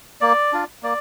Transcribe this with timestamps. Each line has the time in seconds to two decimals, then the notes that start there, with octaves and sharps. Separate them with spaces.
0.21 A#3 D5
0.53 D4 F4
0.83 A#3 D5